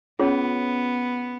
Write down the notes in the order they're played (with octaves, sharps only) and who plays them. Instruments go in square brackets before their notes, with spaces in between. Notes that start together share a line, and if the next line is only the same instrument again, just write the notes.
[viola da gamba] B3 [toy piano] C#4 F4 G#4 C#5